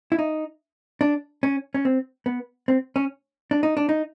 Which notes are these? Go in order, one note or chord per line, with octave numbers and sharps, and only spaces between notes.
E4
D#4
D4
C#4
C#4
C4
B3
C4
C#4
D4
D#4
D4
D#4